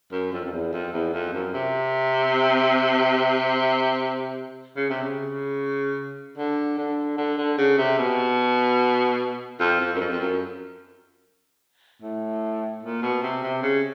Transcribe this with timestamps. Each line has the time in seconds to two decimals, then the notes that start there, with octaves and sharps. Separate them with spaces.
0.12 F#2
0.33 F2
0.45 F2
0.52 E2
0.73 F2
0.92 E2
1.13 F2
1.33 F#2
1.54 C3
4.76 C#3
4.90 C3
5.03 C#3
6.37 D3
6.78 D3
7.17 D3
7.38 D3
7.58 C#3
7.78 C3
7.98 B2
9.60 F2
9.80 F2
9.95 F#2
10.00 F2
10.12 F2
10.20 F#2
12.02 A2
12.83 A#2
13.02 B2
13.22 C3
13.43 C3
13.63 C#3